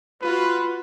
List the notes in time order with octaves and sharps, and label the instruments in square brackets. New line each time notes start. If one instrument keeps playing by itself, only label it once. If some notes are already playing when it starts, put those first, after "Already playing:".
[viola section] F4 F#4 [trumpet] B4